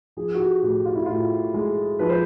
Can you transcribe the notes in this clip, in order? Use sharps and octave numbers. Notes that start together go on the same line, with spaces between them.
F3 G#4
F#4
G4
A2 F#4
F4
E4
A2 F4
G#3
F3 B4
C5